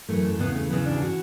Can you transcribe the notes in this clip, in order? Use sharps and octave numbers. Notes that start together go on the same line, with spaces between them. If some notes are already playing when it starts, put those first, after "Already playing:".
F#2 E3 A3
A3
E2 C#3 E3 B3
A3
E2 C#3 E3 B3
D4
G#4
E3 F#4